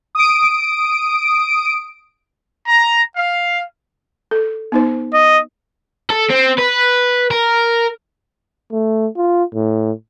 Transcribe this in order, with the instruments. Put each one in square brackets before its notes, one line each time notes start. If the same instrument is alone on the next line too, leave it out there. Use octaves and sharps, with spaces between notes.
[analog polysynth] D#6 D7
[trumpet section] A#5
F5
[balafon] A4
B3 D#4 C5
[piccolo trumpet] D#5
[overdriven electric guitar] A4
C4
B4
A#4
[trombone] A3
F4
A2